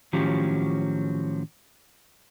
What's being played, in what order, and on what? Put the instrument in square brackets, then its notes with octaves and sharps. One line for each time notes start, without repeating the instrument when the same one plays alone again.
[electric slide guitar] A2 D#3 F3 F#3 C#4 G4